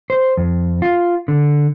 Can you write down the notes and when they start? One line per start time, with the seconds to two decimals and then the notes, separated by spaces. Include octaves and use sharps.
0.10 C5
0.37 F2
0.82 F4
1.28 D3